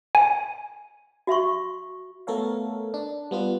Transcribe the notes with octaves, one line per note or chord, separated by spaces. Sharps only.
G#5
F#4 E5 C6 C#6
A3 B3 A4 A#4 C#5 F5
D4
G3 B3 F4 B4